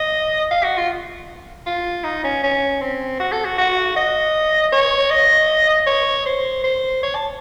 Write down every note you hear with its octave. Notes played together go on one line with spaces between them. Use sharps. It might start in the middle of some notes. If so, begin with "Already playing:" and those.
Already playing: D#5
F5
F#4
F4
F4
D#4
C#4
C#4
C4
F#4
A4
F#4
F#4
D#5
C#5
D#5
C#5
C5
C5
C#5
A5